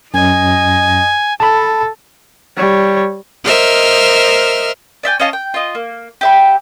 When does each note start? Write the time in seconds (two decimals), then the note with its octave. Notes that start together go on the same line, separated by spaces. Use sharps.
0.14 F#2 D#5 G#5
1.40 A4 A5 B5
2.56 G3 C#5
3.44 A#4 C5 D#5 E5 F6
5.03 D5 E5 G5 G#5
5.20 C#4 D#5 F5 A5
5.33 G5
5.54 F4 D#5
5.75 A#3
6.21 G4 E5 B5